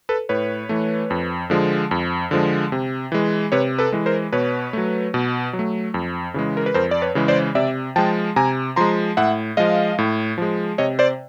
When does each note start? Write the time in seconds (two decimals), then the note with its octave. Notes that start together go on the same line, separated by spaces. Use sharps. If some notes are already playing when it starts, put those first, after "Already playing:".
0.09 A4 B4
0.29 A2 B4 C#5
0.69 E3 A3
1.10 F2
1.50 D3 F3 G#3
1.91 F2
2.31 D3 F3 G#3
2.72 C3
3.12 E3 G#3
3.52 C3 B4 C#5
3.78 A4 B4
3.92 E3 G#3
4.06 A#4 C5
4.33 B2 B4 C#5
4.73 F#3 A3
5.14 B2
5.53 F#3
5.59 A3
5.94 F2
6.34 C#3 E3 G#3
6.57 A#4
6.66 B4
6.74 F2 A#4 C5
6.91 D5
7.02 B4 C#5
7.15 C#3 E3 G#3
7.28 C5 D5
7.55 C3 D5 E5
7.96 F3 G#3 G5 A5
8.36 C3 G#5 A#5
8.76 F3 G#3 A#5 C6
9.17 A2 E5 F#5
9.57 F3 G#3 D#5 F5
9.98 A2
10.38 F3 G#3
10.78 C3 C#5 D#5
10.99 C5 D5